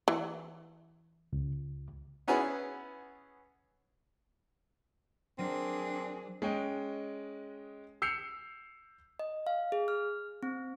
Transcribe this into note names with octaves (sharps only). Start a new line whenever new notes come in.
E3
C#2
B3 C#4 E4 F#4 G#4 B4
F#3 C4 D4 G#4 A#4
G#3 C#4 D#5 G5
E6 G6 C7 C#7 F7
D#5
F5
G#4
F6
C4